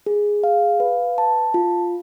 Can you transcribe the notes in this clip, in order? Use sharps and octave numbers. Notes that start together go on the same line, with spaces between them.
G#4
F5
B4
A5
F4